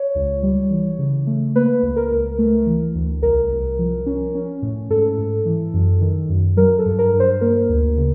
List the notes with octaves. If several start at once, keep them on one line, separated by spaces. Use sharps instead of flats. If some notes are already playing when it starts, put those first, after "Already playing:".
Already playing: C#5
C#2
G3
E3
C#3
A3
A#3 B4
C#2
A#4
C#2
A3
E3
D2
C2 A#4
C2
F3
C#4
C#4
A2
G#2 A4
G#2
E3
F#2
D#3
F#2
F#3 A#4
A4
G2
A#4
G2
C5
A#3 A#4
D2
C#3